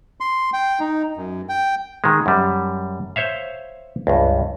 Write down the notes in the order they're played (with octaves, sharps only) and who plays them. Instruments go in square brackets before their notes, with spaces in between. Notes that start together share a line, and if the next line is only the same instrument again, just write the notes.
[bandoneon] C6
G5
D#4
F#2
G5
[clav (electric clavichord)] D#3 G#3
F#2 G3
C5 C#5 E5 F5
C#2 G2